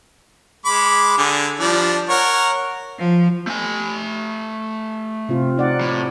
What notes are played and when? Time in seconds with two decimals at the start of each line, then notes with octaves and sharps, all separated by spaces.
0.66 G#3 B5 D6
1.18 D3 G#4
1.60 F3 G3 D4
2.09 A#4 C#5 F#5
2.99 F3
3.47 A3 G#5
5.29 C3 C4 F4
5.57 D#4 D5 F#5
5.81 A2